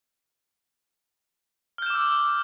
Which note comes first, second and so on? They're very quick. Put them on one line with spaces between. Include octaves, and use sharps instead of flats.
F6 G6 E7 D6 E6